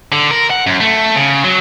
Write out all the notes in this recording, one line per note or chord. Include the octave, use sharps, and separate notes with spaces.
D3
A#4
F#5
F#2
A3
C#3
F#3